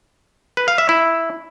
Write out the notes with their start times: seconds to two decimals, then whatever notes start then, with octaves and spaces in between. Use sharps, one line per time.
0.57 B4
0.68 F5
0.78 E5
0.89 E4